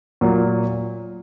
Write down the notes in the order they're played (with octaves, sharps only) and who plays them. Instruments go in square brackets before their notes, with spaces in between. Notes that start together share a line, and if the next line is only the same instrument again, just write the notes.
[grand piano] A#2 F#3 A#3